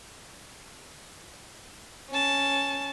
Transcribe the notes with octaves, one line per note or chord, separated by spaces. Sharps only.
C#4 A5